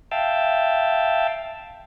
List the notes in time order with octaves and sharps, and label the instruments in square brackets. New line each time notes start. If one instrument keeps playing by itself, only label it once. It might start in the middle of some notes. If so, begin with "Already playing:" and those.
[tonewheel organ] E5 F5 G5 A5